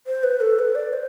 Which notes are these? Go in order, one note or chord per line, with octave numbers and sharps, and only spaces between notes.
C5
B4
A4
B4
D5
C5